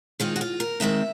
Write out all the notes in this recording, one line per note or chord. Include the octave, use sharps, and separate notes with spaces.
D#3 G#3 C4 D#4 F4
F#4
F4
A#4
D#3 G#3 C4 D#4 E5